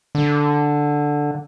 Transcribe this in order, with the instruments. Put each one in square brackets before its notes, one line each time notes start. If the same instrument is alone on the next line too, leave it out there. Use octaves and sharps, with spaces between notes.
[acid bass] D3